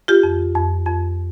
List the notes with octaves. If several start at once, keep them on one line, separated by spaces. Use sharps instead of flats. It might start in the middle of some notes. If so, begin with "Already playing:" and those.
F4 G4
F2
F2
F2